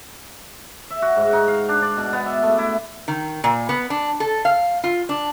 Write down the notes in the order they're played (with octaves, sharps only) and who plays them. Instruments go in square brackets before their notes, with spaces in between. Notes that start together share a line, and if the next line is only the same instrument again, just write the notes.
[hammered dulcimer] E5
F#4
G#2
D#4
F5
D4
D5
B2
B3
E5
A3
E4
[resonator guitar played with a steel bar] D#3
A#2
B3
D4
A4
F5
F4
D4